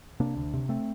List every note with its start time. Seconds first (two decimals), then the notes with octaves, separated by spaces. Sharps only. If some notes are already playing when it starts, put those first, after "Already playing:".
0.20 C3 A#3 D4
0.36 D2
0.54 C3
0.69 A3 C4